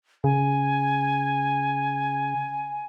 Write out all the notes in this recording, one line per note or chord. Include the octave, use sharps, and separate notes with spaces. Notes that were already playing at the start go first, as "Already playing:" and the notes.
C#3 G#5